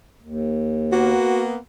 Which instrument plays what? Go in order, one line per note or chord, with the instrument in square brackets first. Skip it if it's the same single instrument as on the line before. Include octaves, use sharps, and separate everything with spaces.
[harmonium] D#2
[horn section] A#3 B3 [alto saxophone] F#4